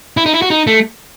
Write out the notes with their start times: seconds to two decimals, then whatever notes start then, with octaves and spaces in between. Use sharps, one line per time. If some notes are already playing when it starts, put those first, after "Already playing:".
0.17 E4
0.26 D#4
0.34 E4
0.42 F#4
0.50 D#4
0.67 A3